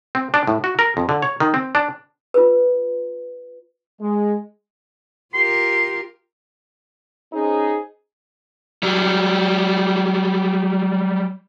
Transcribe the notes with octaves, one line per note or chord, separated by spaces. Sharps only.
C4
D4
A2
F#4
A#4
F2
D3
C#5
D#3
C4
D4
F4 B4
G#3
F4 G4 A#4 C6
C#4 D#4 G#4 C5
F#3 G3